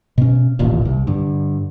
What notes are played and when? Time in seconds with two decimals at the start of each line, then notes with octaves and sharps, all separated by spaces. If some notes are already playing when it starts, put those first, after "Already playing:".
0.18 B2 C#4
0.59 E1 A1 D#2 A#2
0.85 C2
1.07 G2 D3